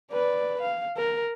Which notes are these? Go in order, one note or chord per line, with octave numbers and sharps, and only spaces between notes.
B4 D5
F5
A#4